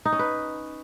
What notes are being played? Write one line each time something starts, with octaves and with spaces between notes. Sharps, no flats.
D#4
C#4
B4